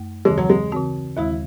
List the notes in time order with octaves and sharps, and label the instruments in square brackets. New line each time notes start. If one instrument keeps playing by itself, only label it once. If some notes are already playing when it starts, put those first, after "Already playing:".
Already playing: [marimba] F#2 A3
[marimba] D#2 C#3 E3 C4 [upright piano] G#3
[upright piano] F#3
G#3
[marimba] C#3 E3 C4 F#4
[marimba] D#2 D#3 G#3 [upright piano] E4